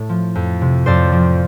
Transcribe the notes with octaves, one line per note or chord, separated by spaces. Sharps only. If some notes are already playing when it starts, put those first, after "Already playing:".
Already playing: A2 A3
F3
F2
C3
F2 C5 D5
F3